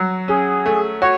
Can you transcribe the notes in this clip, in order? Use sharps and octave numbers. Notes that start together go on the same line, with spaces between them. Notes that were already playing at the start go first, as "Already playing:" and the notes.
Already playing: F#3 F#4
C#4 G#4
A3
F#4 C#5